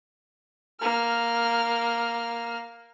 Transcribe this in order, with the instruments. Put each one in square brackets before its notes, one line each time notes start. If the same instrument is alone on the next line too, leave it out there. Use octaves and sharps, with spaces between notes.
[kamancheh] A#3 F6